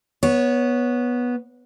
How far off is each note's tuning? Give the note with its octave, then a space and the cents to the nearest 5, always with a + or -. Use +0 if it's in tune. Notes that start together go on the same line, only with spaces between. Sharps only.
B3 -10 C#5 +0